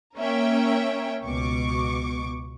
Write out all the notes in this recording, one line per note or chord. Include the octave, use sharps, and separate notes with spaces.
A#3 C#4 A#4 C#5 E5 G5
C#2 B2 C#6 D6